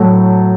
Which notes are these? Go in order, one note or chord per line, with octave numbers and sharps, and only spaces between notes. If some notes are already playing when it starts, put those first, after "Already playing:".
Already playing: A2 F#3 A3